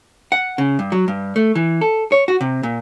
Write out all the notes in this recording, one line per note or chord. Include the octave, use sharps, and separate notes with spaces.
F#5
C#3
G2
F#3
G2
A3
E3
A4
C#5
F#4
C3
A#2